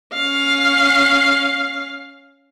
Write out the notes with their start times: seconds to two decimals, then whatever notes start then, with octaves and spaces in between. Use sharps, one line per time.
0.13 C#4 F5